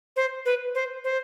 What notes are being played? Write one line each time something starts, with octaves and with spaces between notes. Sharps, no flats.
C5
B4
C5
C5